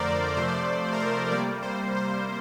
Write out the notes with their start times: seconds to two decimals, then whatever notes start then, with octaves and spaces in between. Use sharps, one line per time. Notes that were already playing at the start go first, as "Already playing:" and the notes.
Already playing: F2 D3 A3 A#4 C5 D5
0.37 C3 F3 A3 C5
0.48 D5
0.59 C5
0.84 C5
0.93 A#4
1.00 C5
1.31 C3 G3 A#3 D5
1.63 C5
1.95 C5